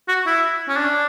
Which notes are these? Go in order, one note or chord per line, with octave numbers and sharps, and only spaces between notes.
F#4
E4
C#4
D4